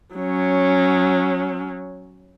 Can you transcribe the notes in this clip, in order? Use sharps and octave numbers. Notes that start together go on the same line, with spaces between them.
F#3 C#4